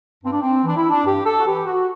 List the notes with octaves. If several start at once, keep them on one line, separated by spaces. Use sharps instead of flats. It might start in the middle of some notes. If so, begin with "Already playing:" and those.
G2 C4
D4
C4
E3 D4
E4
D4
G2 G4
A4
F#4
E3 G4
F#4